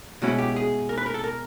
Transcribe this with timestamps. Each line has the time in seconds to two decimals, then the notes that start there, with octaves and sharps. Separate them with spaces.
0.22 B2 G#3 C#4 E4 F#4
0.38 G4
0.56 G#4
0.89 A#4
0.98 B4
1.06 A#4
1.14 A4
1.24 A#4